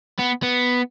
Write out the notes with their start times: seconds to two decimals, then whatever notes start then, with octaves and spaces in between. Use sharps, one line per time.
0.19 B3
0.43 B3